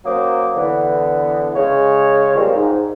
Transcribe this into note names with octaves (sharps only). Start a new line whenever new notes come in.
F#3 A#3 C#4 C5 D6 D#6
D3 E3 B3
C#3 G#3 C#5
F3 G3 G#3 A#3 C4
G#2